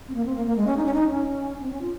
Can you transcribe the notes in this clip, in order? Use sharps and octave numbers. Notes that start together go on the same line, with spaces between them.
C4
A#3
C4
A#3
A#3
G#3
C#4
D#4
C#4
D#4
C#4
C4
C#4
F4